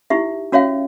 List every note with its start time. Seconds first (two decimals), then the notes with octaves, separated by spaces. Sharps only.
0.10 D#4 E4 G4 E5
0.52 C#4 F#4 C#5 E5 F5 G5